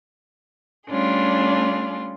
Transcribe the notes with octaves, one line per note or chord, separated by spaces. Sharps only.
G3 A3 C#4 D4 F4 G#4